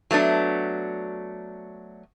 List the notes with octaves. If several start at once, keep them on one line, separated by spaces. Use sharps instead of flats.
F#3 A3 B3 D4